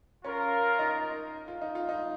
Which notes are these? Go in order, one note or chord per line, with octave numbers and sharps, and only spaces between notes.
C#4 F4 A#4 F5
D#4
F4
D#4
F4
D#4